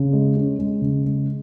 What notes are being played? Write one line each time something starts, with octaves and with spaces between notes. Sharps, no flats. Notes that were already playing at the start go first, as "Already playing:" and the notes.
Already playing: C#3
G#3
C#4
G#3
C#3
G#3